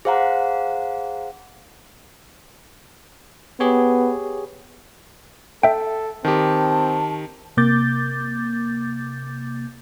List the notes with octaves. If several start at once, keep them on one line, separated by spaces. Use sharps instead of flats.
G#4 C5 F5 F#5 A#5
B3 G4 G#4 C#5
A4 E5 G5
D#3 C4 G4 A5
C3 A#3 D6 G6 A6